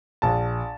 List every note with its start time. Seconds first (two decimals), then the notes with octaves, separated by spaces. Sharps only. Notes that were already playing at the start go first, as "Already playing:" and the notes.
0.22 A#1 A5